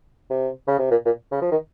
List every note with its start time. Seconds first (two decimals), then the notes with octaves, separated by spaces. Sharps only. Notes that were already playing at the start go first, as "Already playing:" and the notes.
0.30 C3
0.68 C#3
0.79 C3
0.91 A#2
1.06 A#2
1.32 C#3
1.42 F3
1.52 D#3